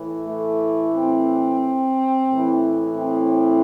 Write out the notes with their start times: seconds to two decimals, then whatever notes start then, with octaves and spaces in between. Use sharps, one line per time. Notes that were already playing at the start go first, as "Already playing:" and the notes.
Already playing: A2 E3
0.26 A3
0.94 C4
2.29 A2 E3
2.96 C4